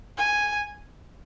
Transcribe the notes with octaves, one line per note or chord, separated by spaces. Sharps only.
G#5